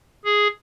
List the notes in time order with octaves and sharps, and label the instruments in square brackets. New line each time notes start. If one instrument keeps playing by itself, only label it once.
[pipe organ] G#4